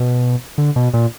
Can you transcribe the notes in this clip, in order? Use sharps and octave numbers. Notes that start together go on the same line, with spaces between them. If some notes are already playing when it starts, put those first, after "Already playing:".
Already playing: B2
D3
B2
A#2